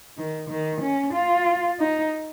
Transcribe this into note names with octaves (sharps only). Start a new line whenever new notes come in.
D#3
D#3
C#4
F4
D#4